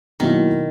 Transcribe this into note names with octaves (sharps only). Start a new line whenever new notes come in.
B2 D#3 F#3 A#3 E4